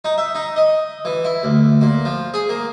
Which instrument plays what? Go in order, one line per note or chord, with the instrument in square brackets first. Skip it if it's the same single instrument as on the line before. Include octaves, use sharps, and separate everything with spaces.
[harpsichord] D#4
E5
D#4
D#5
E3
E4
D2
A#2
F3
G#4
A#3